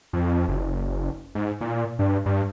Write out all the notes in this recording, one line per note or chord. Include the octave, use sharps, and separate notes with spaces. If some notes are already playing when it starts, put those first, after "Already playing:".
F2
F#1
G#2
A#2
G2
G2